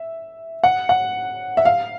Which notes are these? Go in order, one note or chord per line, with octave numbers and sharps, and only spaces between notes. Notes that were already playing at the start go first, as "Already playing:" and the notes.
Already playing: E5
F#5
F#5
E5
F5